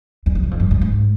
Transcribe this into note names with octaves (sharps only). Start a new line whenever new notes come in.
E2
F2
F#2
F2
F#2
G2
G#2